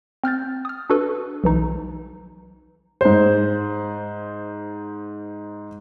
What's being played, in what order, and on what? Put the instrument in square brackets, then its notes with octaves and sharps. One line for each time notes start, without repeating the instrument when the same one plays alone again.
[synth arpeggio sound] C4 F6 G6 A6
D#6 F6
D4 F#4 A4 B4
B1 E3 D#4
[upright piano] G#2 C5